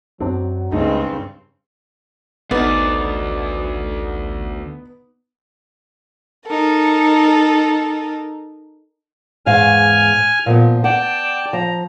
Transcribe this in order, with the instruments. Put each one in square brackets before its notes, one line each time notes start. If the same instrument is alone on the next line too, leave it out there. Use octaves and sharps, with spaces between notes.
[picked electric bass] F#2 D4 [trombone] F#3 [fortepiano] C4
[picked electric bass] C#2 A3 [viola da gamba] G2 C#3 C4 [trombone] G#3 [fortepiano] D#4
[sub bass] A1 [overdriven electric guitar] D2 [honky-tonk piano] B3 D#4 [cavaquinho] D5
[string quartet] D#4 A4 A#4
[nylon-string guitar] E2 G#2 F5 [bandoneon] G#5 F6
[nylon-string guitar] A#2 B3 [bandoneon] F3
[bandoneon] D5 G5 A5 [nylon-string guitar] F#5
[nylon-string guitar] F3 [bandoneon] A#5